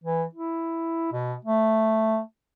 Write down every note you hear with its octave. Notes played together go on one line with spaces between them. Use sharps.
E3
E4
B2
A3